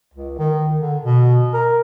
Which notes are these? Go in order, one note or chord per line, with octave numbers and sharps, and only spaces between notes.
C#2
D#3
D3
B2
A#4